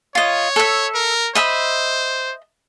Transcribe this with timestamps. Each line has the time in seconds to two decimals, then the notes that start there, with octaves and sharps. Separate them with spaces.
0.15 F4 C#5 D#5
0.56 A4 E5
0.95 A#4
1.35 C5 D#5 E5 B5